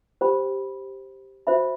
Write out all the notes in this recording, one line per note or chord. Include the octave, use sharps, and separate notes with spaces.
G4 C5 G5 B5
F#4 C5 E5 B5